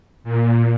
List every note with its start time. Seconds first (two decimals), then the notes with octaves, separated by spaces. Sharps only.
0.24 A#2